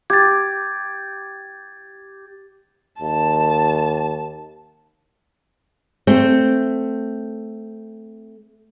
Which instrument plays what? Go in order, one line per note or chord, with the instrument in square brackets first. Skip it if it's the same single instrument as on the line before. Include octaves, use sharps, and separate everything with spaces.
[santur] G4 [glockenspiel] G#6 A6
[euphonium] D#2 [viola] A5
[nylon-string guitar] A3 C4